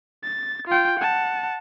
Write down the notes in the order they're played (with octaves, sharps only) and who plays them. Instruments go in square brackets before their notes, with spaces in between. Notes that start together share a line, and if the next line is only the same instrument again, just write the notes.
[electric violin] A6
F4 G5
F#5 A5